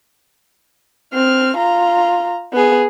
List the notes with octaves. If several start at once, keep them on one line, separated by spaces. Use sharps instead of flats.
C4 F6
F4 A#5
B3 G#4